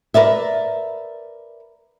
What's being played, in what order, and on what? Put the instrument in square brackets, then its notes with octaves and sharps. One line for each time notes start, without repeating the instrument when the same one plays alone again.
[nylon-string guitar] A#4 B4 D5 E5